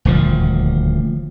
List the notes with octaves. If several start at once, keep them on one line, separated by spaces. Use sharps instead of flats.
D#1 D2 F3